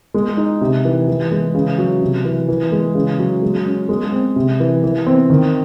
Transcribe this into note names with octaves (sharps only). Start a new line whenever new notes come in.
G#3
D#4
C3
E3
E3
G#3
C#3
F#3
C3
E3
E3
G#3
C#3
F#3
G#3
C#4
G#3
C4
C3
E3
E3
C4
D#3